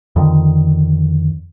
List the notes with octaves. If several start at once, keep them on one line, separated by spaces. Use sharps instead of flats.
F2 D3 D#3